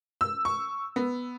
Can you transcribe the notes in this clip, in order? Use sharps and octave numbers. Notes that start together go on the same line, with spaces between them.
E6
C#6
B3